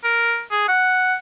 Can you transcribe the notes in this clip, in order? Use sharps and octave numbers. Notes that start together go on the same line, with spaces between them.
A#4
G#4
F#5